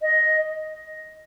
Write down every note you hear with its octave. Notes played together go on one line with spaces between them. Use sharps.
D#5